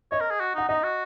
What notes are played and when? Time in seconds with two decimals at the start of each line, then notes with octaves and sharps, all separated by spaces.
0.11 C#5 D#5
0.21 A#4
0.30 G#4
0.40 F#4
0.55 D#4 F#5
0.68 D#4 D#5
0.83 F#4